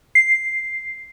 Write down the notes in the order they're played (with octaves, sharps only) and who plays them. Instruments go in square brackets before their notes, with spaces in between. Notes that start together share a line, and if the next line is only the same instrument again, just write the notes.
[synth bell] C7